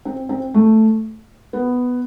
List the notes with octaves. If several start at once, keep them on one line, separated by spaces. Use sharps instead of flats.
C4
C4
A3
B3